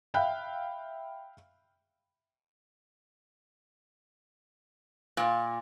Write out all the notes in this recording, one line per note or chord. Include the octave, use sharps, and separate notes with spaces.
E5 F5 G5 B5 F#6
A#2